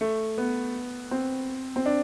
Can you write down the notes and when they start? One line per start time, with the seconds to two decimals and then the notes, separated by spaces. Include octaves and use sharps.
0.01 A3
0.38 B3
1.11 C4
1.76 C4
1.86 D4